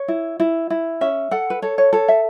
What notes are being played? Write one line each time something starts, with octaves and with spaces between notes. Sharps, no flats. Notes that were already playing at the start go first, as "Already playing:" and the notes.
Already playing: C#5
E4
E4
E4
C#4 E5
A4 F#5
B4
A4 C#5
C#5
A4 C#5
E5